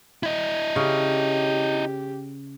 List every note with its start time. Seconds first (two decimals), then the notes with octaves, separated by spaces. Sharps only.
0.23 E4 D#5
0.76 C#3 G4